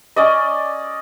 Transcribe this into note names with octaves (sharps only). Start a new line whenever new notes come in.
C#4 D5 D#5